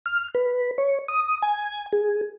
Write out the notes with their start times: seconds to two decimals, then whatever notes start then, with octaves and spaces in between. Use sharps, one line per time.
0.06 F6
0.35 B4
0.78 C#5
1.08 D#6
1.42 G#5
1.92 G#4